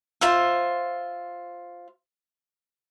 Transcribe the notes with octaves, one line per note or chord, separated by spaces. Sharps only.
F4 C5 E5